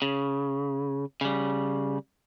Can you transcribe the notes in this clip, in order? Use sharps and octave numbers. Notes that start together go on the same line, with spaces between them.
C#3
C#3 G3